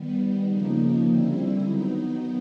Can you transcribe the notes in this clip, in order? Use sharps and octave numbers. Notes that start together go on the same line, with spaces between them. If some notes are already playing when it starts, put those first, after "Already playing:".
Already playing: D#3 G3 B3
C#3 F3 A#3 D#4
D3 G3 C4 E4
D#3 F#3 B3 D#4